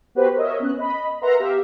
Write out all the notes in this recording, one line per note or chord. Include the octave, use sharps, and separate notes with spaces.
B3 F#4 G4 B4 C5
A#4 C#5 D#5 E5
B3 C#4 F#6
D#5 B5
A#4 B4 E5 F#5 A#5 C6
B3 G4 E5 F5